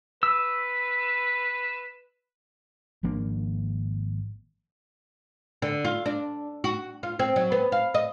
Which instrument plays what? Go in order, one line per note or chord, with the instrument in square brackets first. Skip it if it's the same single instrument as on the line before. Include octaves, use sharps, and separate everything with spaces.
[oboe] B4 [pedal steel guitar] E6
[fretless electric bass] G#1 F3 A#3 D4
[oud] D3
F4
D4
F#4
F4
C4
F#3
B3
F5
D#5